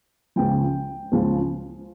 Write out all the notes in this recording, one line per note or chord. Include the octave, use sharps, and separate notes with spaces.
C#2 C#3 F3 G5
C#2 C#3 F3